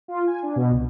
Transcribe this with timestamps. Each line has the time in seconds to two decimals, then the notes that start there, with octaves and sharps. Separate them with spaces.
0.08 F4
0.27 G#5
0.43 D4
0.56 B2
0.72 C2